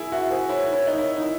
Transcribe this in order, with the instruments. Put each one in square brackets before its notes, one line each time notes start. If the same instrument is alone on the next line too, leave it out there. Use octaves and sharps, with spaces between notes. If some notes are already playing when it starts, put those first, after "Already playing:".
Already playing: [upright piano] E4 G#4
[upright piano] F#4 [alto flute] E5
[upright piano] G#4 [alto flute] C5
[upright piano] E4 [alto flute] C#5
[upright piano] E4
D#4
E4
D#4
E4